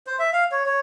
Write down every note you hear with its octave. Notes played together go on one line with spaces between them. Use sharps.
C5
E5
F5
C#5
C#5